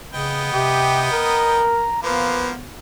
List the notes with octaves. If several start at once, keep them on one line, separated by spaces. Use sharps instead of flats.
C#3 B3 D#5 G5
C3 G4
A#4 A#5
F3 A#3 B3 B4